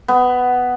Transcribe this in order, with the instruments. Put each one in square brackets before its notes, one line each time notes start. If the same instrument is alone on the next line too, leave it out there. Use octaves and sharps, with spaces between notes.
[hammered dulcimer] B3